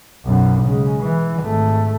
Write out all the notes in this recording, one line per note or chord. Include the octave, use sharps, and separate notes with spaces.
B1 F#2
C#3 G#3
E3
G#1 A3